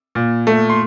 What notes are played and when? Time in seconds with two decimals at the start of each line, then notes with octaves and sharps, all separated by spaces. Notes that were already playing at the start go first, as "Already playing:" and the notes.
0.15 A#2
0.47 A3
0.70 C6